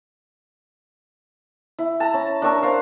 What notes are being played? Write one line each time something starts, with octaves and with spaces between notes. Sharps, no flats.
E4
A5 A#5
C#4
D4 A#4 C#6 E6
C5 F5